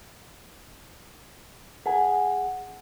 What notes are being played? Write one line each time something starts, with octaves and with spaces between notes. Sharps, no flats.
G#4 F#5